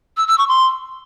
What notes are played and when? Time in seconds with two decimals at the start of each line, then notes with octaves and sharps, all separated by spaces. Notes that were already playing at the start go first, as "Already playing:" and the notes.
0.17 E6
0.28 E6
0.38 C#6
0.48 C6